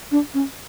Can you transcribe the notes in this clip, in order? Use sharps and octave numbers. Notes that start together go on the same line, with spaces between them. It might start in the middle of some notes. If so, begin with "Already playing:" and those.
D4
C#4